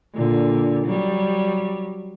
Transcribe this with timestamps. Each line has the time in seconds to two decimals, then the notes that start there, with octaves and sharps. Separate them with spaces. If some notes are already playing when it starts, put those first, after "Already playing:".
0.14 A#2 D3
0.86 F#3 G3